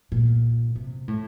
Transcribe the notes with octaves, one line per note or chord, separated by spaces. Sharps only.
A#2
C3
A2